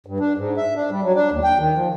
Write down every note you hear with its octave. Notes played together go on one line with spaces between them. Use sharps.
G2
D4
G#2
E5
D4
G3
F#3
D4
D#2
G5
D#3
F3